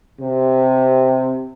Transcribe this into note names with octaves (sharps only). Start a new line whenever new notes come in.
C3